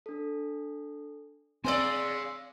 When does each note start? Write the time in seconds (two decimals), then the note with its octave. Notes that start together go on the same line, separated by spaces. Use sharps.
0.06 D4 A4
1.64 G#3 C4 C5 D5 F5 G#5 C6 E6